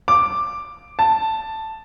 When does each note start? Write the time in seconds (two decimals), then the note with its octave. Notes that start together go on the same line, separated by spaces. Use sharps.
0.08 D6
0.99 A5